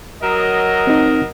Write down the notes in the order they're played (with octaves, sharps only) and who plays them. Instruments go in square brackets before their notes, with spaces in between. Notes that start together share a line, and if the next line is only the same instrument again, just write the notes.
[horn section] F#3 A#4 D#5
[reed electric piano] C4 D#4